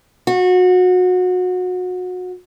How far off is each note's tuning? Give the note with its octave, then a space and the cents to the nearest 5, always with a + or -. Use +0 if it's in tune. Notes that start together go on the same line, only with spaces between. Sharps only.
F#4 -25